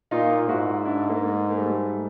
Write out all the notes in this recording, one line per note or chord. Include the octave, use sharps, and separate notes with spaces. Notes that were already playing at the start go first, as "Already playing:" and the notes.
A#2 D#4 F4
G#2 E4 F#4
D4 E4
G#3 A#3
A#3
G3 A3